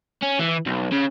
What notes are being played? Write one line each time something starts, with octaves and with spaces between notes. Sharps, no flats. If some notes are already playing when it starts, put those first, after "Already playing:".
C#4
E3
B1
C#3